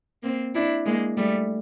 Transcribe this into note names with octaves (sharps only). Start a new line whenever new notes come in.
A#3 C4
D4 E4
G#3 A#3
G3 A3